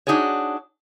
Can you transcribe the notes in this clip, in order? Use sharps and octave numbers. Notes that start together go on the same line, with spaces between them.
D4 D#4 F#4 G#4 C#5